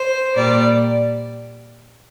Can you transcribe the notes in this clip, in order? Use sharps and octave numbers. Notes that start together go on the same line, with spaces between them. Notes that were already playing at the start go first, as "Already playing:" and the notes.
Already playing: C5
A#2 G3 D5